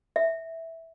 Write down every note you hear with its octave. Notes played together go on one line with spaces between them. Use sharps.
E5